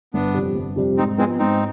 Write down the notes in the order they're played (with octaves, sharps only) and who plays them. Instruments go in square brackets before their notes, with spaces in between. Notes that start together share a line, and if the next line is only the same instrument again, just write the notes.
[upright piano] G1 [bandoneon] B3 D4
[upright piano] F2 C3 G3
G1
F2 C3 G3
[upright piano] G#2 [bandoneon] C4 D#4
[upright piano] F3 B3 [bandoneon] G#3 C4
[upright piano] G#2 [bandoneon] C4 D#4